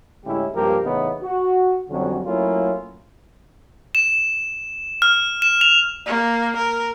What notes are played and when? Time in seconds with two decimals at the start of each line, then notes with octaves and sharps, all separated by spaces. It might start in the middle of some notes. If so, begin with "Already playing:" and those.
0.25 A2 D3 G#3 C#4 E4 G4
0.55 C#2 G2 F3 A#3 G4 A#4
0.84 A2 C#3 E3 B3 C#4 D#4
1.22 F#4
1.90 F2 D3 F#3 G3 C#4 F#4
2.25 F#3 A3 A#3 C#4 E4 F4
3.95 E7
5.02 F6
5.42 E7
5.61 F7
6.06 A#3
6.57 A#4